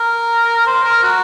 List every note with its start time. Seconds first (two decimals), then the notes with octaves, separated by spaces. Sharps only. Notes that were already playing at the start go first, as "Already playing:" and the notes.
Already playing: A#4
0.66 C5
0.84 A#4
1.03 F#4